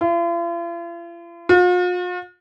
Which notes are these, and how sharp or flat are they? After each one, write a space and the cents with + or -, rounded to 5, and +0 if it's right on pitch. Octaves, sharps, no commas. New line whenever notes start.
F4 -45
F4 +45